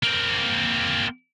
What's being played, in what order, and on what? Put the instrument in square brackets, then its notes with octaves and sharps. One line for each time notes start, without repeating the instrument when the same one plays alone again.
[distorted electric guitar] A#3 C4